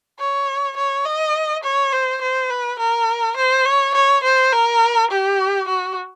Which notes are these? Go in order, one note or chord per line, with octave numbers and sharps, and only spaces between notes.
C#5
C#5
D#5
C#5
C5
C5
B4
A#4
C5
C#5
C#5
C5
A#4
G4
F#4